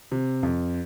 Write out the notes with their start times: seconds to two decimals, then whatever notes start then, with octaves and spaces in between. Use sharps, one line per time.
0.12 C3
0.43 F2